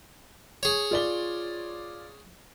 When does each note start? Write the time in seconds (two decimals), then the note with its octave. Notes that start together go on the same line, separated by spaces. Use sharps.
0.63 G#4 C#5
0.91 F4 D5 G7